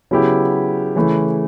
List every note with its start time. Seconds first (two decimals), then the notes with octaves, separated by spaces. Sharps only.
0.11 C#3 F#3 B3 E4 G4
0.96 C#3 E3 A3 E4